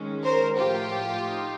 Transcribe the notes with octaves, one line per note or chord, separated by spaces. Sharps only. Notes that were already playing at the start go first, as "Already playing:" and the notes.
Already playing: D#3 G#3 C#4
A#4 C5
A2 F3 A3 F4 G4
D#4